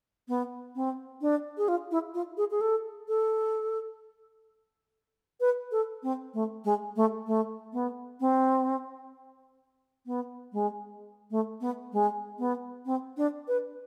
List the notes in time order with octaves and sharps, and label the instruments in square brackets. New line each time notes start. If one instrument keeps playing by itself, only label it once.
[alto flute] B3
C4
D4
G#4
F4
E4
F4
G#4
G#4
A4
A4
B4
A4
C4
A3
G#3
A3
A3
B3
C4
B3
G#3
A3
B3
G#3
B3
C4
D4
B4